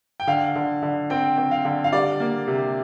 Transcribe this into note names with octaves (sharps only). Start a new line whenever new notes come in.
G5
D3 F5
D3
D3
C4 G5
C4
F5
D3
F5
G3 D5
A#3
C3